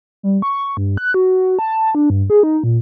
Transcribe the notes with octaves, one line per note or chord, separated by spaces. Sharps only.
G3
C#6
G2
F#6
F#4
A5
D4
G2
G#4
D#4
A#2